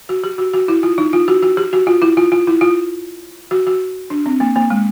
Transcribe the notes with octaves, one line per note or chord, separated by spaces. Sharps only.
F#4
G4
F#4
F#4
E4
F4
D#4
F4
F#4
F#4
G4
F#4
F4
E4
F4
F4
E4
F4
F#4
F#4
D4
C4
A#3
A#3
G#3